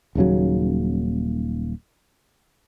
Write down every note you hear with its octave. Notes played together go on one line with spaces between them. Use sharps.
D#1 D#2 C#3 F#3